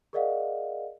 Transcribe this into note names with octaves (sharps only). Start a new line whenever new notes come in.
G#4 A#4 D5 D#5 F5 F#5